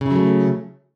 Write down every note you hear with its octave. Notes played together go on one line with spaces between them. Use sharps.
C#3 F#3 A3 E4